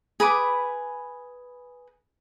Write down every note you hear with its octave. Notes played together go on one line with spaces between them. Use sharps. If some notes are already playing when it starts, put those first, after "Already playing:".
G#4 B4 B5 D6